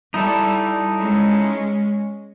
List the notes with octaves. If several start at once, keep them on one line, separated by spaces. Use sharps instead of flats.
G3 D#4 E4 A4
G#3 C#4